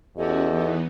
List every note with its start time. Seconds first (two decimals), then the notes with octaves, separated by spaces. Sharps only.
0.17 E2 C#4 F#4 G4 A4 D#5
0.50 E3 B3 D#4